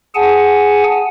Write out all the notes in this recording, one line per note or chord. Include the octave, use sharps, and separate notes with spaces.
G#4 F#5 G#5 A5